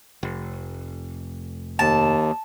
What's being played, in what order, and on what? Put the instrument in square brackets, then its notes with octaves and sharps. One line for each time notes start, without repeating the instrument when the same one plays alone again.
[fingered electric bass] F1
[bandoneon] D#2 [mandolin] A5